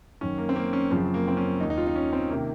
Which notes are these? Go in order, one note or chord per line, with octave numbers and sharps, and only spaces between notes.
F#2 D#3 C#4
A#3
C4
A#3
C#4
F#2 C#3 F3 C4
A#3
C4
C#4
D#2 D#3 D#4
D#4
F4
D#4
C#4
C4
C3 D#3 A#3